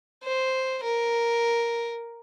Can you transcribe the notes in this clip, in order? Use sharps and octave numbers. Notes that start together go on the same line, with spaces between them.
C5
A#4